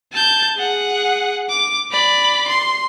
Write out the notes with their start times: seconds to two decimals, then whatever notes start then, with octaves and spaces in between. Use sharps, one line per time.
0.13 A5 G6
0.57 G#4 F#5
1.49 D6
1.91 D5 B5
2.48 C6